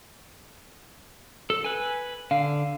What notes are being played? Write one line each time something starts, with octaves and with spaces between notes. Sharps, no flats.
A4
B4 G#5
D3 F5